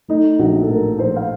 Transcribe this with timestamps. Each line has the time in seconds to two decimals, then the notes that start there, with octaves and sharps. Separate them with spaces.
0.08 A3 D#4
0.39 A#1 F#4
0.62 A4
0.69 A2 A#4
0.99 A#1 C5
1.16 F5